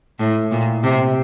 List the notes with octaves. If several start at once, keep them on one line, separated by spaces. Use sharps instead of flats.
A2
A#2
C3